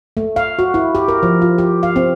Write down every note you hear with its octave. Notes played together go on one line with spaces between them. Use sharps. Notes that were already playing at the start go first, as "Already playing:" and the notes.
A3
F5
F#4
E4
G4
A#4
F3
F4
G4
F5
C4